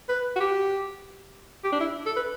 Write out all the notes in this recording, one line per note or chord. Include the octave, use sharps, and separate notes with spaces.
B4
F#4
G4
G4
D4
E4
A4
B4